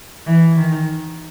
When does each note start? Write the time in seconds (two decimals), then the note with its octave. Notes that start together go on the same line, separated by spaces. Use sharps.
0.26 E3
0.56 D#3